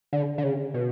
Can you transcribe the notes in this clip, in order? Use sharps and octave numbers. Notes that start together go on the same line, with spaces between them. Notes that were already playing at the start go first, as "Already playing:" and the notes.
D3
D3
C#3
B2